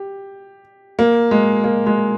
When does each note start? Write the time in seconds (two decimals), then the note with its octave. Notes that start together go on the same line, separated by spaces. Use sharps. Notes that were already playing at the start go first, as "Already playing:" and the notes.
Already playing: G4
0.99 A#3
1.31 G#3
1.64 A#3
1.86 G#3